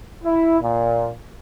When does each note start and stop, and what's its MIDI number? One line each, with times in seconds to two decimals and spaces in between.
0.24 0.59 64
0.61 1.09 46